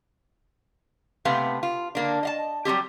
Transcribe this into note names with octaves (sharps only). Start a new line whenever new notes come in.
C3 A3 B3 C4 B4 F5
F4
D3 A#3 D4
D#5 F5 A5
F#3 G3 C4 G4